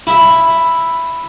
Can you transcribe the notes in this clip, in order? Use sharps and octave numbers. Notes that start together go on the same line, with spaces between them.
E4 E5